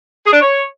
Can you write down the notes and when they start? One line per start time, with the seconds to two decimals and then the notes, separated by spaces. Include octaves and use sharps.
0.25 G#4
0.33 D4
0.41 C#5